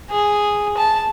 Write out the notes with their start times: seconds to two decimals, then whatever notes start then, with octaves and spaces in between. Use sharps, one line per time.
0.10 G#4
0.77 A5